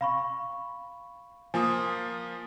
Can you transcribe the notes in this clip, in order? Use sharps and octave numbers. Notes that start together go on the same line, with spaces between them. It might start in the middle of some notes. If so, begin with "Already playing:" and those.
F5 B5 C#6
F3 A#3 F4 G#5 D#6